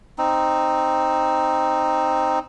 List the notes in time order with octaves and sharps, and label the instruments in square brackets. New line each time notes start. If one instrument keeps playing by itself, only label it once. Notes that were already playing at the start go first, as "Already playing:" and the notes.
[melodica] C4 D#4